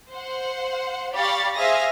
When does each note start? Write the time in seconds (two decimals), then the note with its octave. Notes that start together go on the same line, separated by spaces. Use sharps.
0.11 C5 F#5
1.14 G4 D5 F5 B5 C#6 A6
1.55 G#4 C5 E5 F5 A#6